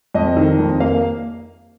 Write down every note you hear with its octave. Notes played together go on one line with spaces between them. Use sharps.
F2 D#5
D#3
F2
A#3 F5